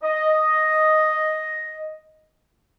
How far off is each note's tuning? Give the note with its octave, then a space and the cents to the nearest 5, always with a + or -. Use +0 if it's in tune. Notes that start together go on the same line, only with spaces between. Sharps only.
D#5 +0